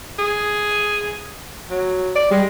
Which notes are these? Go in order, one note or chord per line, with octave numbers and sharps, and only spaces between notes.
G#4
F#3
D5
G3 G#3